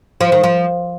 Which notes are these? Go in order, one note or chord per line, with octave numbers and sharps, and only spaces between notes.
F3
D#3
F3